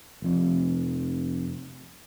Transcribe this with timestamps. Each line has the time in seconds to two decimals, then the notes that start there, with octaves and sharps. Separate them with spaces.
0.22 F1 F2